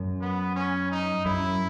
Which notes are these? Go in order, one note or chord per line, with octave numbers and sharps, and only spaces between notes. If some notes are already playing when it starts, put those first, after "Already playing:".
Already playing: F#2
B3
C#4
D#4
F#2 E4